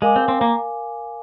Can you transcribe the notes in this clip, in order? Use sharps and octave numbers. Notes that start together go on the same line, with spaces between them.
G#3 A#4 F5 G#5 D6
C4
C4
A#3